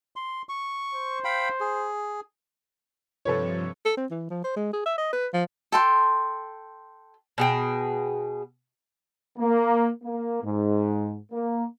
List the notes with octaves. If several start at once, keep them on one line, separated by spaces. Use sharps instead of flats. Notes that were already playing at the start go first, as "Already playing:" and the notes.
C6
C#6
C5
F5 G5 B5
G#4
G2 C3 F3 A4 B4 C#5
A4
C4
E3
F3
C5
G#3
G#4
E5
D#5
B4
F3
A4 G5 C6
B2 G#4 G5
A#3
A#3
G#2
A#3